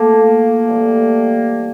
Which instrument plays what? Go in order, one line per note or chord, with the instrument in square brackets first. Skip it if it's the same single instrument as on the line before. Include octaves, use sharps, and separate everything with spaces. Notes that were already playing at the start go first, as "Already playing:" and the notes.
Already playing: [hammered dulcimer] A3 C4 F4 [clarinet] A#3
[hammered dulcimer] A2 E3 G3 C4